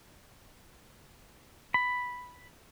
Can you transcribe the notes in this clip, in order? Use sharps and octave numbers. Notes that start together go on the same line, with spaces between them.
B5